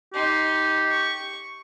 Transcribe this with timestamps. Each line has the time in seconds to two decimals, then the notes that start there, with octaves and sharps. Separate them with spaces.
0.14 D#4 G4 C6
0.90 C#6